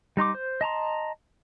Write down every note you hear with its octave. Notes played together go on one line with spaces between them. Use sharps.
G3 D#4 C6 D6
C5
D#5 A5 A#5 C6